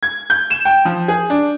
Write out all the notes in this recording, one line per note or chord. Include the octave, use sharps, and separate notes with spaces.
G#6
G6
E7
G5
F3
G#4
D4